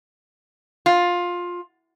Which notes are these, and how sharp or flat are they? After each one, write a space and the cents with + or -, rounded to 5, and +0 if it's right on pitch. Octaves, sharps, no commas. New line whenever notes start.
F4 +15